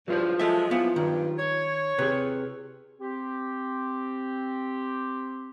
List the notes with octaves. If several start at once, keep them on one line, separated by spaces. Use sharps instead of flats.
E2 G2 F#3 F4 C5
F3 G#3 A4 E5
E3 F3 B3
G2 D#3
C#5
C3 G#4 B4
C4 G4